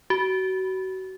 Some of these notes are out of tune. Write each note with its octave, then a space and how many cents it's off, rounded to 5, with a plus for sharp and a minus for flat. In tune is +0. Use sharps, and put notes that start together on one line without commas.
F#4 +30